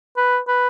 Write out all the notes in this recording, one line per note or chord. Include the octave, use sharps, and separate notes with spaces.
B4
B4